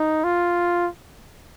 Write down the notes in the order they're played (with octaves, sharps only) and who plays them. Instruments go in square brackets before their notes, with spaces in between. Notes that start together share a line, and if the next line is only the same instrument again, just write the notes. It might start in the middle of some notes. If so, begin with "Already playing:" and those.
Already playing: [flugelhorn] D#4
F4